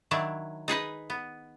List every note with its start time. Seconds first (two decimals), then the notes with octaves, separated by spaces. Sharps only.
0.11 D#3 F#3 D4 E4
0.68 D#4 G#4 B4 D#5
1.10 B3